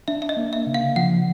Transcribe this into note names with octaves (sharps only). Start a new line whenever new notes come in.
D4 E5
E5
D#5
A#3
E5
C#3
F5
F3 F#5